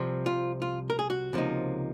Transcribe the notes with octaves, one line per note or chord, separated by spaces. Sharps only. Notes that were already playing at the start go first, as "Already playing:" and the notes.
Already playing: C2 C3 F3 C4
F4
F4
A#4
G#4
F#4
C#2 C3 F3 A#3 D#4